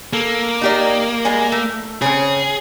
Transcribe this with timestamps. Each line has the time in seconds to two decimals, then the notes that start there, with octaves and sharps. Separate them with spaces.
0.13 A#3 A4
0.61 D#4 G4 D5
1.25 G3 G#3 G#5
1.52 A3
2.02 C#3 C4 C#4 G#4